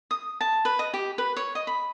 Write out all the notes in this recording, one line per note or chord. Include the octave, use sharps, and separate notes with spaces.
D#6
A5
B4
D#5
G4
B4
C#5
D#5
B5